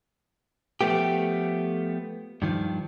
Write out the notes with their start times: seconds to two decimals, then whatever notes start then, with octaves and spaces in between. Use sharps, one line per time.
0.81 F3 A3 B3 G4
2.42 G2 D#3 F3